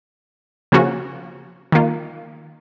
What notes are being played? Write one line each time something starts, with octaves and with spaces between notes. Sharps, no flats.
C#3 F3 A#3 C#4 F#4
D#3 A#3 F4